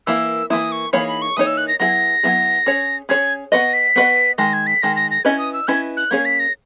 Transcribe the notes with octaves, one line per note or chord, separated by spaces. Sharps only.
E3 A#3 E4 E6
E3 A#3 E4 D#6
C#6
E3 A#3 D#4 G#4 C#5 B5
B5
C#6
E3 A#3 D#4 G#4 C#5 D#6
E6
F#6
A#6
F#3 B3 E4 G#4 A#6
F#3 B3 E4 G#4
C#4 G#4 C#5
C#4 G#4 C#5 G#6
B3 F#4 B4 D#5 A#6
B6
B3 F#4 B4 D#5
D#3 G#3 A#6
G#6
B6
D#3 G#3 A#6
A#6
A#6
C#4 E4 B4 D#5 G#6
D#6
E6
C#4 E4 B4 D#5 G#6
F#6
A#3 C#4 G#4 C#5 G#6
B6
A#6